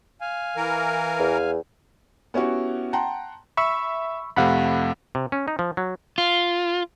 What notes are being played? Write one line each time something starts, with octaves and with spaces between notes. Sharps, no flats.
F5 G#5
E3 A#4
E2
B3 C#4 E4 F#4 G4
F#5 G5 A5 A#5 C6
E5 B5 C#6 E6
F2 C3 A3 F5 F#5 B5
C3
C#4
D#4
F3
F#3
F4